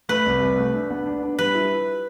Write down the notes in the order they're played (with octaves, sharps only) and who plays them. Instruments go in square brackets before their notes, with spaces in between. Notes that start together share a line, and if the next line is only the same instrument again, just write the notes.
[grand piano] A3 [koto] B4
[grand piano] C2
C2
A3
D4
B3
D4
D4
[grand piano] G3 [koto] B4
[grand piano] E4